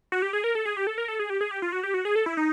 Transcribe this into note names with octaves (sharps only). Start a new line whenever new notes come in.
F#4
G4
G#4
A#4
A4
G#4
G4
A4
A#4
A4
G#4
G4
G#4
G4
F4
F#4
G4
F#4
G#4
A4
E4
D#4